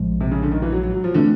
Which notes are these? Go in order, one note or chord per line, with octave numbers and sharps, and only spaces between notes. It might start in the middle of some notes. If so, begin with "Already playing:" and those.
Already playing: A#1 A2 F3 G#3
C3
C#3
D3
D#3
E3
F#3
F#3
F#3
F3
D3 E3 A3 C4